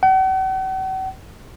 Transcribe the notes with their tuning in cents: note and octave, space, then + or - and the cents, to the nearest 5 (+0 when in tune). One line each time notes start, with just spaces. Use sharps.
F#5 +45